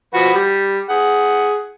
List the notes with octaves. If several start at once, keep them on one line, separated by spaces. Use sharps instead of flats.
F3 F#4 B4
G3
G#4 F#5